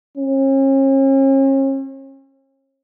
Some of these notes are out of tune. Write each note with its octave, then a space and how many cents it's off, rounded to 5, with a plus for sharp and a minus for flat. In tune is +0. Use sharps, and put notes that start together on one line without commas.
C#4 -40